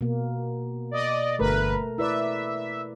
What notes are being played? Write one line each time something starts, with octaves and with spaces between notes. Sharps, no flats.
B2 A#3
D5 D#5
G1 A3 A#4 B4
E4 B4 D5 E5